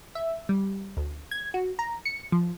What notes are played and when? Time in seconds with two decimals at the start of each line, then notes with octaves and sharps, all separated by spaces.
0.15 E5
0.49 G3
0.97 D2
1.31 G#6
1.54 F#4
1.79 A#5
2.05 C#7
2.32 F3